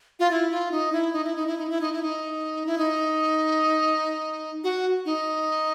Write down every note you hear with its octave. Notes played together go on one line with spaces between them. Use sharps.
F4
E4
F4
D#4
E4
D#4
E4
D#4
E4
D#4
E4
D#4
E4
D#4
E4
D#4
F#4
D#4